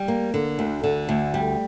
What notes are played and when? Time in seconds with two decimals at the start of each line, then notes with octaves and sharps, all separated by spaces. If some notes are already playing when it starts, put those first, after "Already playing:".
Already playing: G3
0.08 A#3
0.34 D3
0.59 D2
0.84 D3
1.09 D2
1.34 G3